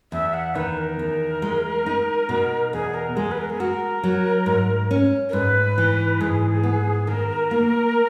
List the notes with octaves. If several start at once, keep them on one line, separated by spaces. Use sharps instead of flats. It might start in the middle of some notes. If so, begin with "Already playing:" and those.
E2 E5
F#5
D#3 B4
A#4
E2
G#3
D#4
B2
E2 G#4
A#4
G#3 G#4
B4
A#4
G#4
F#4 A#4
F#3
G#2
C#4
A#4
G#2 B4
E3
G#2 G#4
B3
D#3 A#4
A#3